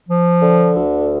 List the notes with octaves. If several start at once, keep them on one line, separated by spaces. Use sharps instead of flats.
F3
D3
D2